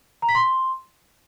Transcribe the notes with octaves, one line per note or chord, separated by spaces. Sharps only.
A#5
B6
C6